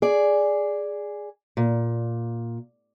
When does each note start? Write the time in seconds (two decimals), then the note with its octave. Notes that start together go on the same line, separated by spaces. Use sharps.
0.02 G#4 D5
1.57 A#2